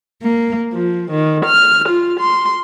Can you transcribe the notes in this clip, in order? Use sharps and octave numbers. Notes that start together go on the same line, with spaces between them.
A#3
F3
D#3
F6
F4
C6